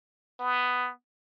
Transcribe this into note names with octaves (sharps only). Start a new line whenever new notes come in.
B3